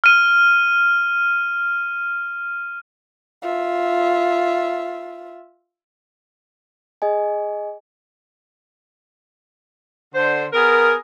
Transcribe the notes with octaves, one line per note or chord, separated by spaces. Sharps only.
F6 D#7
F4 E5
G#4 D#5 G#5
D3 C5
B3 G#4 A#4